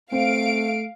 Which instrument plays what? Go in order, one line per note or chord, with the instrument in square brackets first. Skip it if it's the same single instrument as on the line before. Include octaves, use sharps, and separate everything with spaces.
[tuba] A3 [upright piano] C4 [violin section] F5 D7